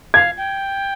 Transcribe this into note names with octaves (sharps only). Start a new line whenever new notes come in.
F5 G#6
G5